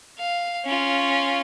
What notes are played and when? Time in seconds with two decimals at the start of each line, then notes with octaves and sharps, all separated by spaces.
0.19 F5
0.65 C#4 F4